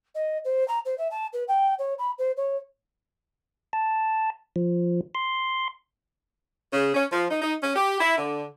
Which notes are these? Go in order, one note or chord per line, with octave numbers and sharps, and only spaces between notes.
D#5
C5
A#5
C5
E5
A5
B4
G5
C#5
B5
C5
C#5
A5
F3
C6
C#3
C#4
F3
D#4
D#4
C#4
G4
E4
D3